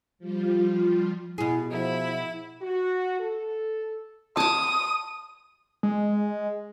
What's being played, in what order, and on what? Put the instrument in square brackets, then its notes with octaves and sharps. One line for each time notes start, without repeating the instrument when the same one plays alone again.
[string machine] F3 G3 F4
[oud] B2 G#4 [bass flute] E4
[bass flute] F3 [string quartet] E4
[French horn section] F#4
A4
[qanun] A5 D6 [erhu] D#6
[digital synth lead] G#3